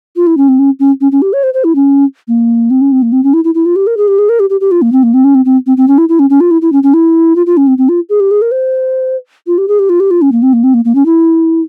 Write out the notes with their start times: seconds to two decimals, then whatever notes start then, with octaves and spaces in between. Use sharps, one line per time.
0.16 F4
0.27 E4
0.37 C#4
0.48 C4
0.59 C#4
0.80 C#4
1.01 C#4
1.12 C#4
1.22 G4
1.33 C#5
1.43 C5
1.54 C5
1.64 E4
1.75 C#4
2.28 A#3
2.70 C4
2.81 C#4
2.92 C4
3.02 A#3
3.12 C4
3.24 C#4
3.33 E4
3.44 E4
3.55 E4
3.66 F4
3.76 G4
3.87 A#4
3.97 G#4
4.08 G4
4.19 G#4
4.29 A#4
4.40 G4
4.50 G4
4.61 G4
4.71 F4
4.82 A#3
4.92 C4
5.03 A#3
5.14 C4
5.24 C#4
5.35 C4
5.45 C4
5.67 C4
5.77 C4
5.88 C#4
5.98 E4
6.09 E4
6.19 C#4
6.30 C#4
6.40 F4
6.51 E4
6.62 E4
6.72 C#4
6.83 C#4
6.94 E4
7.36 F4
7.46 F4
7.57 C#4
7.67 C4
7.78 C4
7.89 F4
8.09 G#4
8.20 G4
8.31 G#4
8.42 A#4
8.52 C5
9.47 F4
9.58 G4
9.68 G#4
9.79 G4
9.89 F4
10.00 G4
10.11 F4
10.22 C#4
10.32 A#3
10.42 C4
10.53 A#3
10.64 C4
10.74 A#3
10.85 A#3
10.95 C#4
11.06 E4